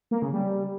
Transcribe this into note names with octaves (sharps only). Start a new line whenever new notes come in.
A#3
C#3
G3